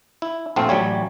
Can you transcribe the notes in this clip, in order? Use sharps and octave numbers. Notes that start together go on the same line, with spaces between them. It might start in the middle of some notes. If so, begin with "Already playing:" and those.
E4
A#1 A3 C4 F5
A1 F#3 G3 C#5